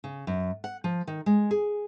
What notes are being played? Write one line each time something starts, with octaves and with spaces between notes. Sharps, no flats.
C#3
F#2
F#5
F3
D#3
G#3
G#4